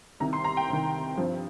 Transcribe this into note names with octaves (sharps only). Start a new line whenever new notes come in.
C2 C3 D#3 A#5
C6
A#5
G5
C2 C3 D#3
G2 F3 C4